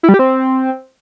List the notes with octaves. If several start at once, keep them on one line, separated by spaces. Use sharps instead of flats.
E4
G3
G4
C4